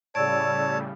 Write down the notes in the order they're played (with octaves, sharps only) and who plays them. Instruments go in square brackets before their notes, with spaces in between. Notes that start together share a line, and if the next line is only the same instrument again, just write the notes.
[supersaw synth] A2 C#3 G3 [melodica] C#5 A5 [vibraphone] D5 E6